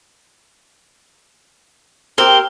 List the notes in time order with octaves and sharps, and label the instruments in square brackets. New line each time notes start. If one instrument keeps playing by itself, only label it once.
[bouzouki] C4 G4 [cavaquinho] A#4 [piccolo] G7